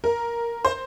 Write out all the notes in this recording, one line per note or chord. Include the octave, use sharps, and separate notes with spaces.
A#4
C5